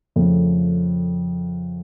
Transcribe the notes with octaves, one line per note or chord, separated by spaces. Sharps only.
F2 C#3 F3 A3